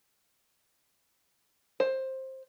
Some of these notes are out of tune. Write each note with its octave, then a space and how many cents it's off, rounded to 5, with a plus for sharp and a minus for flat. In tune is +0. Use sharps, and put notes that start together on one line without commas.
C5 +15